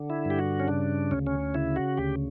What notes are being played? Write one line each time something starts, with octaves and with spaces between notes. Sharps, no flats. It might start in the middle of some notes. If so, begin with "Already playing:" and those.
Already playing: D3
E4
G2
G4
F#4
C#4
C#3 D4
D2 C#4
C#4
C#3 E4
F#4
D2 G4